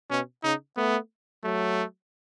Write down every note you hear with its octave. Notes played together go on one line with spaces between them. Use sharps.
B2 C#4
C#3 D#4
A3 B3
F#3 A3